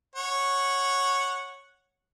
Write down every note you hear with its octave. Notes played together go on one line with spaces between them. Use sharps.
C#5 F#5